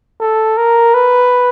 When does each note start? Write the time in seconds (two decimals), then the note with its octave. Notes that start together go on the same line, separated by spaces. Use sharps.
0.20 A4
0.57 A#4
0.94 B4